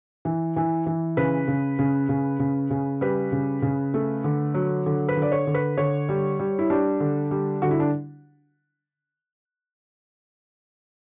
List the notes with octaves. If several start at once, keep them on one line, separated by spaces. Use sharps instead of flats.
E3
E3
E3
C#3 B4
C#3
C#3
C#3
C#3
C#3
G3 B4
C#3
C#3
A3
D3
F#3
D3
B4
D3
D5
C#5
D3
B4
D3 C#5
G3
G3
E4
G3 D4
D3
G3
D3 F#4
E4
D4